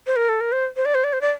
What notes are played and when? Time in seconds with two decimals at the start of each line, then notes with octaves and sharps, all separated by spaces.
0.07 C5
0.16 A#4
0.29 A4
0.41 A#4
0.52 C5
0.76 C5
0.85 D5
0.95 C5
1.04 D5
1.13 C5
1.21 D5